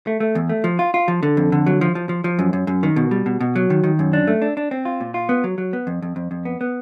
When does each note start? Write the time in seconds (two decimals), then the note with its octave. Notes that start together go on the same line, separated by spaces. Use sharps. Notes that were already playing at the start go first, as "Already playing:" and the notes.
0.07 A3
0.20 A3
0.35 E2
0.49 A3
0.64 F3
0.79 F4
0.94 F4
1.08 F3
1.23 D3
1.37 F2
1.52 D3
1.66 F#3
1.81 F3
1.95 F3
2.09 F3
2.24 F3
2.39 F#2
2.53 F#2
2.67 F#2
2.83 D#3
2.96 B2
3.11 G3
3.26 B2
3.41 B2
3.56 F#3
3.70 D#3
3.84 D#3
3.99 F#2
4.13 D4
4.27 A3
4.42 D4
4.57 D4
4.71 C4
4.85 F4
5.01 A#2
5.14 F4
5.29 B3
5.44 F#3
5.58 F#3
5.73 B3
5.87 F2
6.02 F2
6.16 F2
6.31 F2
6.45 B3
6.61 B3